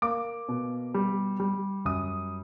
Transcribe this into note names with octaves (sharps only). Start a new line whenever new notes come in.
A#3 D6
B2
G3
G3
F#2 D#6